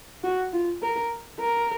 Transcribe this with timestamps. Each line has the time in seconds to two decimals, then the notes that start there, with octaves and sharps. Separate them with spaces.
0.24 F#4
0.53 F4
0.83 A#4
1.41 A#4